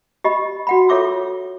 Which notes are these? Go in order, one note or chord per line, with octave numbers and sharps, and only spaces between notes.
G4 D#5 B5
F#4 F#5 B5
F4 A4 C#5 E5 D6 E6